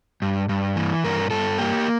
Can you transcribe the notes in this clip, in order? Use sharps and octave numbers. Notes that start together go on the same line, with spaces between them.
G2
G2
E3
G2 A#4
G2 A4
A#3 G4